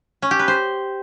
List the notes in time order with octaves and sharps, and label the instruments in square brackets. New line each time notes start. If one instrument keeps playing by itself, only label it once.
[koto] C#4
G4
B4
C5